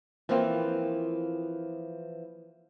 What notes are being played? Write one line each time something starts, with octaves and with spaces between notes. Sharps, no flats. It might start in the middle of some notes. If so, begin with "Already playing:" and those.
E3 F3 A#3 C4 F4